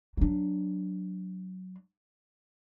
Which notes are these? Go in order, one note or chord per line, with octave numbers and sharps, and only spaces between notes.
F#3 D4